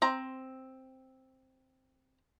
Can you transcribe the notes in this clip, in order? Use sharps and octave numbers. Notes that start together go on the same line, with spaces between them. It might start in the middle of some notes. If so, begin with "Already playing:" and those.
C4 A#5